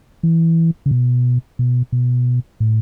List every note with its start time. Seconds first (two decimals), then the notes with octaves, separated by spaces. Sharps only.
0.23 E3
0.86 C#3
0.91 B2
1.59 B2
1.92 B2
2.60 A2